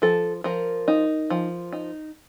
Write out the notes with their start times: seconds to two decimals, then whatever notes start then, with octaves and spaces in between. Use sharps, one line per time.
0.02 F3 A4
0.44 F3 A#4
0.88 D#4
1.30 F3
1.72 D#4